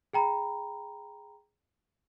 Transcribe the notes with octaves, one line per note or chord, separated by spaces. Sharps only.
G#4 G5 A#5 B5